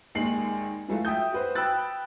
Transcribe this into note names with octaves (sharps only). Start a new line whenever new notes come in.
A#1 D#2 D#3 G#3 C7 F#7
E3 F#3 A3 F4
E5 G5 D#6 G6
F#4 B4 C5
G5 B5 E6 F#6 A6